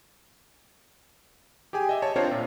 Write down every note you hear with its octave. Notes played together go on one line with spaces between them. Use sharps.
G4 G#4 G5 G#5
D#5 E5
C#5 A5
C4 D4 F4 A#4 C5 C#5
A#2